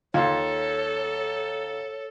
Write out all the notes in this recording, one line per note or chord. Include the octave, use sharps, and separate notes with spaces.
D#2 F4 A4 C#5